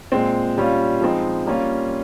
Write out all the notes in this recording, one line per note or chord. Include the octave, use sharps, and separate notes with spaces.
A#2 G#3 C4
A#2 G3 C#4 F4
F3 G#3 C4 D#4
G3 A#3 C#4 F4